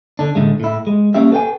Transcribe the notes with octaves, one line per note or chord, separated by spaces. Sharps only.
D3 D4
A2 D3 G#3 A3
A2 E4
G#3
G3 A#3 C#4 G4 E5
A4 B4 D5 F5 G5 G#5